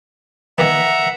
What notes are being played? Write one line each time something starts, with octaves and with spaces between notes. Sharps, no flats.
D#3 A#3 B3 E5 F#5 A#5